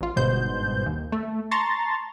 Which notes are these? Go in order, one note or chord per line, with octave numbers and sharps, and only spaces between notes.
A1 F4
G1 G#2 B2 C5 G6
D#2
A3
A5 A#5 C6 C#6 A6